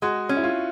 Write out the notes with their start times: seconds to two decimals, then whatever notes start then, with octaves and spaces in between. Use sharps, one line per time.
0.02 G#3 F#4
0.29 C#4
0.37 E4
0.43 F4